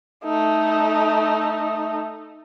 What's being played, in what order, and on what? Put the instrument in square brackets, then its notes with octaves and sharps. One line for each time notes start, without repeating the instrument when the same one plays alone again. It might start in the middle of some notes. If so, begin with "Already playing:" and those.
[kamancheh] A3 D#4